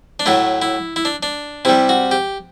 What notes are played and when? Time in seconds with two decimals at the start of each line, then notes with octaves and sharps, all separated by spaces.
0.20 D4
0.26 A2 F#3 A3 E4
0.62 E4
0.96 E4
1.05 D4
1.23 D4
1.65 C3 G3 E4
1.89 F#4
2.11 G4